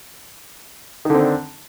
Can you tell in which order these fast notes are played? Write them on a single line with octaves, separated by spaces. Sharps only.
D#3 D3 C4 D4